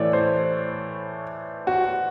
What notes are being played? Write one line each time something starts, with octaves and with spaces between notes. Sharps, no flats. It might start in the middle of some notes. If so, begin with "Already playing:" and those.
Already playing: A2 E3 A3 C#5 D5
C5
F#4